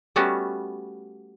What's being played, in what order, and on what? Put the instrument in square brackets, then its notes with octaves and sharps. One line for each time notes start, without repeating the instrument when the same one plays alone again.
[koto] G3 A3 B3 C#4 F#4